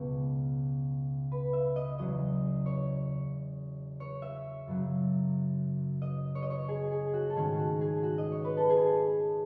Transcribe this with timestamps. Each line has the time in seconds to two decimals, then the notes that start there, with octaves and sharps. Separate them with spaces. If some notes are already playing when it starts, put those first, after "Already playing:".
Already playing: C#2 B2 G#3 B3
1.32 B4
1.53 E5
1.76 D#5
1.98 E2 C#3 F#3 C#4 D#5
2.66 C#5
4.00 C#5
4.22 E5
4.67 F#2 C#3 F#3
6.02 D#5
6.35 C#5
6.42 D#5
6.50 C#5
6.68 G#4
6.92 G#4
7.14 F#4
7.30 A4
7.36 G#2 D#3 A3 C#4 G#4
7.58 F#4
7.81 G#4
8.03 F#4
8.18 D#5
8.32 C#5
8.44 B4
8.57 A4
8.70 G#4